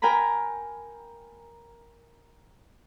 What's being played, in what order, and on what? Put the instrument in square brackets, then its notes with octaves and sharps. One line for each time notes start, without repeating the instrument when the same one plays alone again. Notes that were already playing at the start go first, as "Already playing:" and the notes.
[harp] A#4 G5 G#5 A#5 B5